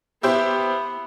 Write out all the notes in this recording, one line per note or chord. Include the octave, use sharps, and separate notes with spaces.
B3 E4 G4 C5